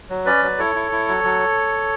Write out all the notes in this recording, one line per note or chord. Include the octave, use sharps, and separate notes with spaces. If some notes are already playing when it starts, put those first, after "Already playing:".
F#3
C#4 B4 D5
F#3
E4 A4 C#5
E4
E4
F#3
F#3